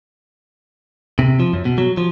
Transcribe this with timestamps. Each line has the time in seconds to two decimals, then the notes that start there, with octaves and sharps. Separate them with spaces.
1.19 C3
1.40 F3
1.53 F#2
1.65 B2
1.78 F#3
1.97 F3